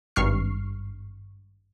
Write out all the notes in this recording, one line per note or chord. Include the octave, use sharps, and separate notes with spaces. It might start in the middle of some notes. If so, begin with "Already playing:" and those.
G#1 G2 C#6 F6 C7